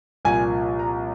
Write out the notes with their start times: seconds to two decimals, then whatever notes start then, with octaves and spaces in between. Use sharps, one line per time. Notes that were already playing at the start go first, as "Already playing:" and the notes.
0.25 C2 A#2 F3 G#5
0.79 A#5